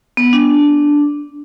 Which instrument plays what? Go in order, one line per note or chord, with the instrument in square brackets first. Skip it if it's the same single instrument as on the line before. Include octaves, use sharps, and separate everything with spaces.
[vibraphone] B3
D4